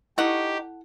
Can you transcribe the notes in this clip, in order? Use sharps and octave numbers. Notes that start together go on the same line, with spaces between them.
D#4 E4 G4 A4 F#5 C#6